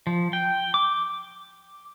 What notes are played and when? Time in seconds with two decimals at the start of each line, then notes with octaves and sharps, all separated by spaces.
0.07 F3
0.33 G5
0.74 D6